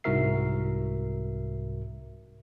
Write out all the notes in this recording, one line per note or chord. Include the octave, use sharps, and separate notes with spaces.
C2 G#2 F#4 A#4 E5 C7